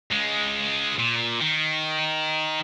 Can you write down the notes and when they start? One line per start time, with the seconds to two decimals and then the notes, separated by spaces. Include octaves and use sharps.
0.11 C#2 G#3
0.99 A#2
1.41 D#3